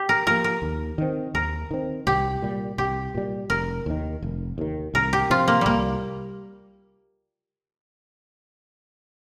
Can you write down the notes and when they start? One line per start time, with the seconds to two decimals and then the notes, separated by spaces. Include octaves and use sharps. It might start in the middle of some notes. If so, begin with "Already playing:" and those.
Already playing: G4
0.09 A#4
0.27 F3 A#3 A#4
0.44 A#4
0.62 D#2
0.98 D#3 C4
1.34 D#2 A#4
1.71 D#3 C4
2.07 C2 G4
2.42 A#2 G3
2.78 C2 G4
3.15 A#2 G3
3.50 F1 A#4
3.86 D#2 D#3
4.22 F1
4.58 D#2 D#3
4.94 C2 A#4
5.13 G4
5.30 C3 F3 C4 F4
5.48 A#3
5.61 C2 G3 A#3